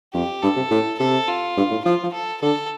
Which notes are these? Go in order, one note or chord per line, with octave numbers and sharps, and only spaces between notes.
F2 G4
G2 A4
C3
A2
C3 A4
F4
G2
A2
F3 F4
F3
A4
D3 A4